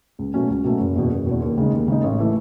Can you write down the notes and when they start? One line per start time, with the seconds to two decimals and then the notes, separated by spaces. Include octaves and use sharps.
0.19 C#2
0.34 B2 F#3 A3 C#4
0.50 C#2
0.64 B2 F#3 A3 C#4
0.80 F#1
0.96 E2 B2
1.11 F#1
1.26 E2 B2
1.42 D#2
1.58 C#3 G#3 D#4
1.72 D#2
1.88 C#3 G#3 D#4
2.04 A1
2.19 E3 A3